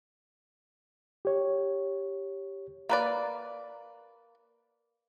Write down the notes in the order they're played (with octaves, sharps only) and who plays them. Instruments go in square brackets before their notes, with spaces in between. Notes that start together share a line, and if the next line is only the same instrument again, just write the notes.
[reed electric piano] G4 C#5
[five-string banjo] A#3 B4 D5